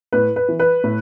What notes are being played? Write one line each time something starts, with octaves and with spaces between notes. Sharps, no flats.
A2 B4
B4
E3
B4
A2